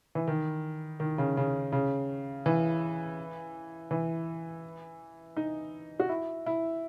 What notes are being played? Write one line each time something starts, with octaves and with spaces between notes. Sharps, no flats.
E3
D#3
D#3
C#3
C#3
C#3
E3
E3
D#4
F#4
E4
E4